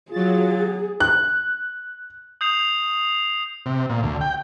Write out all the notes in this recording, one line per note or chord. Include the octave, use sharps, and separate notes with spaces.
F#3 F4 G#4 A6
F#6
D#6 G6 C7 F7
C3
A#2
D2
G5